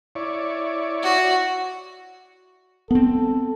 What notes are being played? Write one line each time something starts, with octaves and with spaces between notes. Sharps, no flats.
E4 C#5 D5
F#4
B3 C4 A4